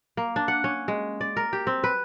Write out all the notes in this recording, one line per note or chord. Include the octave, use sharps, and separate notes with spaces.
A#3
D4
F#5
C#4
G#3
D5
A#4
G4
C4
B4